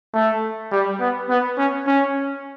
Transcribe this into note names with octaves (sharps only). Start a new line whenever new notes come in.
A3
G3
B3
B3
C#4
C#4